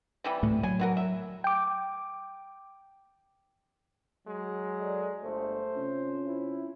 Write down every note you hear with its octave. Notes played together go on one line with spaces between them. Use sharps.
C3 E3 G3
D2 A2 A3
F#3 G#5
E3 F#4 A#4
E5
G5 D6
F#3 G#3
A4 D5 D#5
G1 A3 C5
C3 C#4 F4
E4